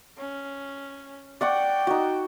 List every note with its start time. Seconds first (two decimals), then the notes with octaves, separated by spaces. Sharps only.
0.18 C#4
1.41 D5 F#5 G5 C#6
1.87 D#4 F#4